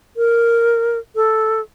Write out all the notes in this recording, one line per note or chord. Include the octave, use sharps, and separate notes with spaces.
A#4
A4